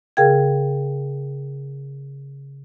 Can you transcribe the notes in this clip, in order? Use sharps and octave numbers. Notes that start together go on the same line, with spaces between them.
C#3 G#4 A#4 F5 G5 G#6